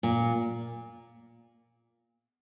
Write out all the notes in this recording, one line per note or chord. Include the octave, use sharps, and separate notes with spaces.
A#2